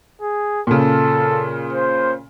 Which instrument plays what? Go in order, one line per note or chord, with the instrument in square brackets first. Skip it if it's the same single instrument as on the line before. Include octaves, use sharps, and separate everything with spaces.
[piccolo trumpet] G#4
[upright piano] A#2 C#3 [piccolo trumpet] A4
[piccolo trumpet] C5